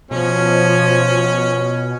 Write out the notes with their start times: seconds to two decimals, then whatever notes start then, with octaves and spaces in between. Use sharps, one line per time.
0.11 B2 F3 C#4